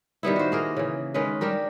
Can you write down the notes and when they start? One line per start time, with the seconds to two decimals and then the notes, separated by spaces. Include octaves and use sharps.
0.23 D#3 G3 B3 E4
0.36 F#4 C5
0.52 A#3 G#4 A#4
0.77 C#3 E3
1.14 D#3 G#3 C#4 B4
1.41 G3 D4 G4 A#4